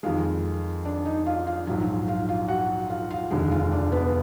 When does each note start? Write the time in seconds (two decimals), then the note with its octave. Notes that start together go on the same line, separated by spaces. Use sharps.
0.03 F2 D#3 G#3 F4 F5
0.85 D4 D5
1.05 D#4 D#5
1.26 F4 F5
1.47 F4 F5
1.67 A#1 G#2 F#3 F4 F5
2.08 F4 F5
2.29 F4 F5
2.48 F#4 F#5
2.90 F4 F5
3.11 F4 F5
3.31 F1 D#2 D3 G#3
3.51 F4 F5
3.71 D4 D5
3.92 B3 B4